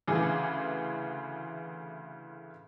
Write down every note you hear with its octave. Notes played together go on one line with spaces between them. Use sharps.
D2 C#3 E3 G#4 D6